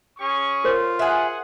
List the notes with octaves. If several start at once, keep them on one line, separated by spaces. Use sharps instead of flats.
C#4 G#4 C#6
F4 A#4 C5 C#5
G#4 E5 F#5 G#5